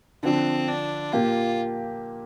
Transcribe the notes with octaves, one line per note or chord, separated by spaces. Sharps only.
D3 F3 C4 D4
D4
A#2 A#3 F4 G4